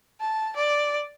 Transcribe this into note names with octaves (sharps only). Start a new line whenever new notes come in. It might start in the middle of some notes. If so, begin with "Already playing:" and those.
A5
D5